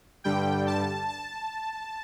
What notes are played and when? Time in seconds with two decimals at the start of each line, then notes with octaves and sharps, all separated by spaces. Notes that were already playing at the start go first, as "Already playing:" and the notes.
0.24 G2 D3 G3 G5
0.67 A5
1.08 A5